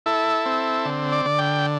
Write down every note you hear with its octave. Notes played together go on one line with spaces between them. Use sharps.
E4 A4
C4
D3
D5
D3
G5